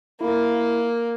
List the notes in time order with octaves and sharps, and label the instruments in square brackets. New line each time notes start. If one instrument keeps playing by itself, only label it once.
[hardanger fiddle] A#3 [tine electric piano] E4